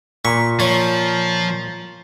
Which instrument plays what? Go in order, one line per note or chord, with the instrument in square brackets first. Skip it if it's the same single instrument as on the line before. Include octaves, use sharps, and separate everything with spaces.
[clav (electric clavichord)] A#2 [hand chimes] A#5 B6 [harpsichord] C#6
[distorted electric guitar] F3 [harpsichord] C#5